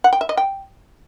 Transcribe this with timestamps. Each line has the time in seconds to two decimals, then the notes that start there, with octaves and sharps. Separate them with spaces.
0.04 F#5
0.13 G5
0.21 E5
0.29 D#5
0.37 G5